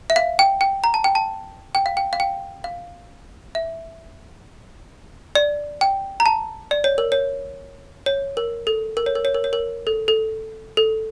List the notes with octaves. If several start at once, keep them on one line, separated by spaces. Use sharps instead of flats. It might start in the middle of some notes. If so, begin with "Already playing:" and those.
E5
F5
G5
G5
A#5
A5
G5
A5
G5
F5
G5
F5
G5
F5
E5
D5
G5
A#5
A5
D5
C#5
A#4
C#5
C#5
A#4
A4
A#4
C#5
A#4
C#5
A#4
C#5
A#4
A4
A4
A4